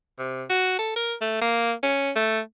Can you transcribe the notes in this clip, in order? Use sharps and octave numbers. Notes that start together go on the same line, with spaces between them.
C3
F#4
A4
A#4
A3
A#3
C#4
A3